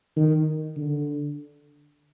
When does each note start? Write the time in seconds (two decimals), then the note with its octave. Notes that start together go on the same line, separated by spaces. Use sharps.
0.16 D#3
0.76 D3